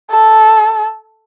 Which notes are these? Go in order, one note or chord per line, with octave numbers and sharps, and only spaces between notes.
A4